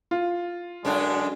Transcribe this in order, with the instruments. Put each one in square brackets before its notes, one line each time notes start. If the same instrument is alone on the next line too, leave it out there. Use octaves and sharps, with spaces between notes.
[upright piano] F4
[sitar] F#2 D3 D4 [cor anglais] G#3